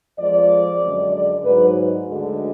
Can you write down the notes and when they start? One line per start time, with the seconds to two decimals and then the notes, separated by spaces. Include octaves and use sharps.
0.18 F2 F3 G#3 D5
0.82 F#2 D3 G#3
1.12 D5
1.44 G#2 F#3 B4
2.07 D2 D3 G#3